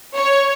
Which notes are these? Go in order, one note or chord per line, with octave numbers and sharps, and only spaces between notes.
C#5